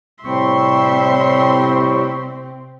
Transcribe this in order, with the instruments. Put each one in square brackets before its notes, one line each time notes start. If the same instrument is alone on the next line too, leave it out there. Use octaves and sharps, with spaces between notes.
[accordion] A2 G3 C#6 [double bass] C3 C4 [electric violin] E5 C6